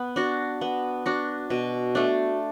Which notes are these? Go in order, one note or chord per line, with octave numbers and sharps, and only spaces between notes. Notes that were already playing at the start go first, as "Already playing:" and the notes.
Already playing: B3
D4 F#4
B3
D4 F#4
B2
A3 D4